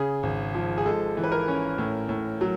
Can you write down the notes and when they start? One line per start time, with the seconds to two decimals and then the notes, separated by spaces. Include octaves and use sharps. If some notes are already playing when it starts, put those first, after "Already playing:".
Already playing: C#3 G#4
0.23 G#1
0.54 F3
0.78 G#4
0.85 G#3 A4
1.17 E3
1.24 B4
1.32 A#4
1.48 C#4
1.78 A2
2.09 A2
2.41 F#3